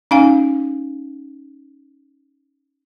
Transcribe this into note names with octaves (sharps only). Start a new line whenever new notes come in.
C#4 D#4 F5 G#5